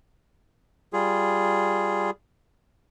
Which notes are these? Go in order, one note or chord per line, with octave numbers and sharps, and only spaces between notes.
G3 F4 G#4